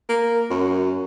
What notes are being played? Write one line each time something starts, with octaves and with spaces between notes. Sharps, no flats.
A#3
F#2